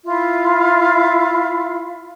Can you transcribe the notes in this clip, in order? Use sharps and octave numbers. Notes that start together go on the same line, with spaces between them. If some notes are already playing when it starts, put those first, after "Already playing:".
E4 F4 E5 F5